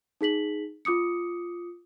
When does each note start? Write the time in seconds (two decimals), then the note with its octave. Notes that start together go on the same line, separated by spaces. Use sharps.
0.21 D#4 G#4 B6 F#7
0.85 F4 D6 D#6 C#7